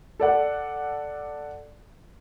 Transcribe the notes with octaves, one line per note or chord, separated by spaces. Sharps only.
A4 D5 F#5